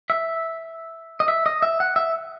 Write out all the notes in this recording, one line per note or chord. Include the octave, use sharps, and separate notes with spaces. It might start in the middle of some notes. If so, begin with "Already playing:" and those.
E5
D#5
E5
D#5
E5
F#5
E5